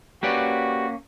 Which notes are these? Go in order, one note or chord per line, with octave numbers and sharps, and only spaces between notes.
A#3 C#4 F#4 G4 B4 D5